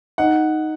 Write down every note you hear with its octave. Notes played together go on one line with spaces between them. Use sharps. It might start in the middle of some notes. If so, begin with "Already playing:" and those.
D#4 F#5